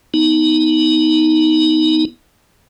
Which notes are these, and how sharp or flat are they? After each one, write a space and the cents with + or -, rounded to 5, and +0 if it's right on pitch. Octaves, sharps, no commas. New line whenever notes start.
B3 +0 D#4 +15